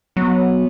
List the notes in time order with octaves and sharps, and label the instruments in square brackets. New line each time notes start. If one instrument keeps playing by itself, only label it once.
[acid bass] F#3 [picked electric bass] B3